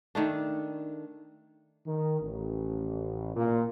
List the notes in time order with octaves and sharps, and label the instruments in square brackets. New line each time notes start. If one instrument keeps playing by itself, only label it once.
[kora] D#3 A3 D4
[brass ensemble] D#3
A1
A#2